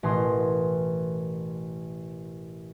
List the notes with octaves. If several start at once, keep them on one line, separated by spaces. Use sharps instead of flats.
A1 B2 E3 A#4 C6 D#6